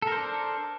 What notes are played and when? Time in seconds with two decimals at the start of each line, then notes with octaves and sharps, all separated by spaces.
0.02 A4
0.07 A#4
0.12 C5
0.17 D4